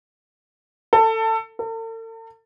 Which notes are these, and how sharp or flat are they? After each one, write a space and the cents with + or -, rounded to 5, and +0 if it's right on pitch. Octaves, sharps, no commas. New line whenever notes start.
A4 +20
A4 +45